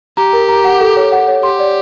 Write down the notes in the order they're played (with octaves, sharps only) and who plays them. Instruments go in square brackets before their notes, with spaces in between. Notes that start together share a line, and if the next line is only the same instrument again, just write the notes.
[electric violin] G4 [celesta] A#5
[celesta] A#4
A#5
F#5
A4
C#5
F#5
C#5
[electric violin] G4 [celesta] C6
[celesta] D5